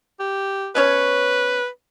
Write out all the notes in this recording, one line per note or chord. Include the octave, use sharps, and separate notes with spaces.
G4
B2 C#4 B4 C#5